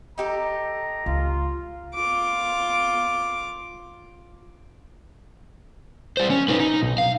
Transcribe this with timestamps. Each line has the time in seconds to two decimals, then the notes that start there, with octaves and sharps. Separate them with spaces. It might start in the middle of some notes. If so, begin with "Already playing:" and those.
0.18 D#4 G4 A4 A#5
1.06 C#2 F4
1.94 F4 D6
6.17 G3 C5
6.30 C#4
6.49 D#4 B4
6.60 D#4
6.81 B1
6.98 F5